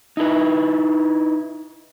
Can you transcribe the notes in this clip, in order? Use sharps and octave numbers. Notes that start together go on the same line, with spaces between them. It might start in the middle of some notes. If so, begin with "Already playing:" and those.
D#4 E4 A4 B4